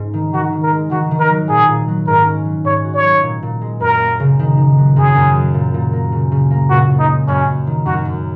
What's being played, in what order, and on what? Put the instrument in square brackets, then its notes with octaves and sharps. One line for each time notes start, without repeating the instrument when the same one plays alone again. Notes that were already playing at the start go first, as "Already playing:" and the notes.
Already playing: [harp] G#2 C#4
D#3
[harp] D#3 [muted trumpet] F#4
[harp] D#3
[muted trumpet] A#4
[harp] G#3
[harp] D#3 [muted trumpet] F#4
[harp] D#3
[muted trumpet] A#4
[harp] F#3
[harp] A#2 [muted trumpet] G#4
[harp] A#2
F#3
[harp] G#2 [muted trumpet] A#4
[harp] C#4
F#3
[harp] G#2 [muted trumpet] C#5
[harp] F#4
[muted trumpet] C#5
[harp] F#3
A#2
A#2
G#3
[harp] F#2 [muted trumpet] A#4
[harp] A#3
C#3
D#3
D#3
F#3
[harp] F#2 [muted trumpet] G#4
[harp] F#2
F#3
A#2
A#2
A#3
C#3
C#3
A#3
[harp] A#2 [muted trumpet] F#4
[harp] A#2
[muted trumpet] D#4
[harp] G#3
[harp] F#2 [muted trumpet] C#4
[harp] F#2
D#3
[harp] F#2 [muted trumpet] F#4
[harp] F#2